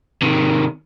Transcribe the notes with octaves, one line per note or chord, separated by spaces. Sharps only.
C3 D#3